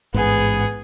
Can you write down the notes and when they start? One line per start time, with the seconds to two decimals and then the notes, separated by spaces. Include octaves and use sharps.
0.14 A1 G#2 B3 G#4